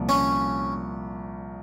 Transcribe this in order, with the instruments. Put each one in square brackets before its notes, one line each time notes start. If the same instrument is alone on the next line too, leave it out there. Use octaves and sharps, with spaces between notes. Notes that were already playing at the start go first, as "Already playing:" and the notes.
Already playing: [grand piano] C2 A#2 F3
[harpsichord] C#4